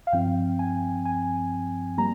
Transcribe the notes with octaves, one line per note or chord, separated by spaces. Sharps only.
F5
G2 F3 C4 G5
G#5
G#5
G3 A#3 A#5